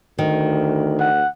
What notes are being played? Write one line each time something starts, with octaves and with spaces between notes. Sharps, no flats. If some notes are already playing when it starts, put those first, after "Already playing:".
D2 D#3
F#5